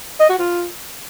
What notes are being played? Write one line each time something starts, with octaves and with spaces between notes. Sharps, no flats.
D#5
F#4
F4